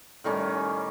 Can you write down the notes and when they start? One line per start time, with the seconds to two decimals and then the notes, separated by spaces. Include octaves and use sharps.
0.24 A2 D#3 G3 C#4